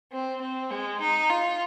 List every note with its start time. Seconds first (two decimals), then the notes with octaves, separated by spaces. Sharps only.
0.12 C4
0.41 C4
0.71 G#3
1.00 D#4
1.30 F4